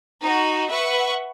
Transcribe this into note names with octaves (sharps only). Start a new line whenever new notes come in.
D#4 F#4
B4 E5 F#5 C#6